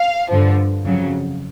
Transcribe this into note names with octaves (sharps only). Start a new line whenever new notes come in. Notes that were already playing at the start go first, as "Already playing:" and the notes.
Already playing: F5
G2 D3 F3
F2 C#3 F#3